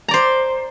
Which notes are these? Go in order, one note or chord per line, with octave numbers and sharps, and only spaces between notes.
C5 D5 A#5